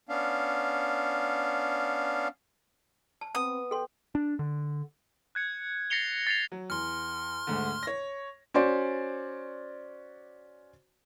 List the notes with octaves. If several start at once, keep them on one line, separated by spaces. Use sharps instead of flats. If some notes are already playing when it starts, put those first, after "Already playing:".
B3 C#4 D4 F5
A5
B3 C4 D#6
A4 G5 C6
D4
D3
F#6 G#6 C#7
A6 A#6 C7 C#7 F7 G7
A6 C7 C#7 F7
F#3
E2 C6 F6
D2 G#2 D3
C#5 A#6
C#4 F#4 C5 D5